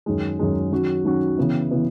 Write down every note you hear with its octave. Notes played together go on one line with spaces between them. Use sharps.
F#2 D#3 G#3
F#2 D#3 G#3
D#3 F#3 C#4 F#4
D#3 F#3 C#4 F#4
C#3 E3 B3 E4
C#3 E3 B3 E4